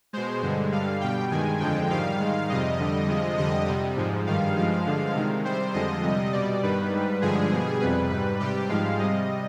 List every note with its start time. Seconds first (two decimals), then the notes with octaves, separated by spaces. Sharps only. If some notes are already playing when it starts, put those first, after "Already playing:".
0.13 B2 G#3 C5
0.42 G2 D3 G#3
0.72 G2 D3 G3 F5
1.01 B2 G3 G5
1.31 G2 D#3 G#3 G#5
1.60 F2 D3 F3 G#3 G5
1.90 G#2 D#3 G3 F5
2.20 G#2 D#3 G#3
2.49 F2 C3 G3 D#5
2.79 F2 D3 G3
3.08 C3 F3 G#3
3.38 F2 D3 G3 D#5
3.67 C3 G3
3.97 G#2 F3 G#3
4.26 G2 D#3 G3 F5
4.56 G2 F3 G#3
4.85 G2 D3 F3 G#3
5.15 C3 D#3 G#3
5.45 C3 G3 C5
5.74 F2 D3 F3 G#3 D#5
6.03 C3 G3
6.33 B2 G3 D5
6.63 G2 D#3 G3 B4
6.92 G#2 G3
7.22 G2 D3 F3 G#3 G#4
7.51 B2 G3
7.81 F2 C3 G3 B4
8.10 G#2 G3 B4
8.40 C3 G3 G4
8.69 G#2 F3 G#3 F5
8.99 C3 G3 D#5